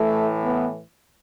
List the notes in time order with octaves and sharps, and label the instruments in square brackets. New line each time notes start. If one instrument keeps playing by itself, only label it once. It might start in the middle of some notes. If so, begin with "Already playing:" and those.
Already playing: [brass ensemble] A2 E3 A3
B3